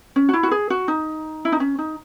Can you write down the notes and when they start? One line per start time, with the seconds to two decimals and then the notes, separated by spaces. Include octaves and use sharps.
0.16 C#4
0.29 F#4
0.33 E4
0.43 F#4
0.51 G#4
0.70 F#4
0.88 D#4
1.45 E4
1.52 D#4
1.60 C#4
1.79 D#4